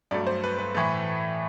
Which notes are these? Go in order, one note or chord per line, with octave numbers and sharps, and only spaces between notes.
G2 F#3 A3 D5
C5
B4
B4
A2 E3 A3